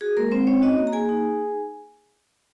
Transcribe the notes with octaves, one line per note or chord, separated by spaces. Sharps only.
F#4 G#4
G#3 A#3 A#4
G#3 C4 C5
C4 C#4 C#5
D#4 F#4 D#5
A#3
A#5
A#3 G#4 G#5
D#4